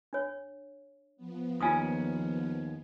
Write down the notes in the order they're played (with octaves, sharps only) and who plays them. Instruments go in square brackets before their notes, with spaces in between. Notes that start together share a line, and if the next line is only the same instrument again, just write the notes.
[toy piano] D4 C#5
[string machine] F3 B3
[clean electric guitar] D#2 C#4 [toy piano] F4 G#5 D#6